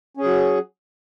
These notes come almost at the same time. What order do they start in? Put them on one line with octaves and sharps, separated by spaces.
C#4 G#4 F#3